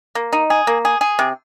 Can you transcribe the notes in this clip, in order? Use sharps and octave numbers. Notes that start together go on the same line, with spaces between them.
A#3
D#4
G#4
A#3
G#4
G#4
C3